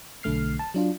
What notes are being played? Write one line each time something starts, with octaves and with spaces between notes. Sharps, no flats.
B1 D3 A3 F6 C7
A5
F#3 D4 F4